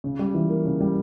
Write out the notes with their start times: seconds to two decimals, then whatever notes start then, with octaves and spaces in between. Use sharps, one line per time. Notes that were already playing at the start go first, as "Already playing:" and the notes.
0.04 C#3
0.19 G3
0.34 E3
0.50 A#3
0.65 C#3
0.80 G3